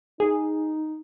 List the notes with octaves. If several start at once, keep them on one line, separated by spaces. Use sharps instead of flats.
D#4 G#4